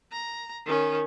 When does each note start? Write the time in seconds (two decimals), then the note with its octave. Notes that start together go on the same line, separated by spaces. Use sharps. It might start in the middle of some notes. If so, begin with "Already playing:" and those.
0.12 A#5
0.65 D#3 C#4